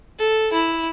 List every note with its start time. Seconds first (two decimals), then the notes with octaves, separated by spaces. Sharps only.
0.18 A4
0.52 E4